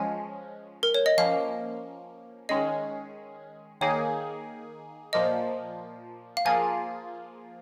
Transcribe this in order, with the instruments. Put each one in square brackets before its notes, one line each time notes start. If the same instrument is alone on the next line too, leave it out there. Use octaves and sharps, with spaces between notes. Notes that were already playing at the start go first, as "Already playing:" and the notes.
Already playing: [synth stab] F3 G#3 C#4 [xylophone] G#5
[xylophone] A#4
C#5
D#5
[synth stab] F3 A#3 C#4 [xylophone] F5
[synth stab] D#3 G#3 C#4 G#4 [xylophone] D#5
[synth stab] D#3 A#3 D#4 G#4 [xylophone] C#5
[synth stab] A#2 F3 A#3 [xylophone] D#5
[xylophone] F5
[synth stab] F3 A#3 F4 G#4 [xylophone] G#5